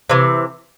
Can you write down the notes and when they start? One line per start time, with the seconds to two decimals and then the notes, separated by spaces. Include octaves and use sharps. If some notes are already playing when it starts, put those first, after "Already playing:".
0.10 C3 E3